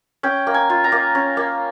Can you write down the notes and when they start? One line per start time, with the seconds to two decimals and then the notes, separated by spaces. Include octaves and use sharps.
0.23 C#4 G5
0.47 A#3
0.54 G#5
0.70 F4
0.84 A#5
0.92 A#3
1.15 C#4
1.37 A#3